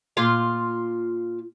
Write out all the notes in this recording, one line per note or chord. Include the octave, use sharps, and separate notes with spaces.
A#2 F4 F5